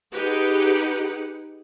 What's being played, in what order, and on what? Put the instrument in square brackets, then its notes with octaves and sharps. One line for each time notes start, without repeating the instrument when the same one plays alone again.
[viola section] D#4 G4 G#4 B4 F#5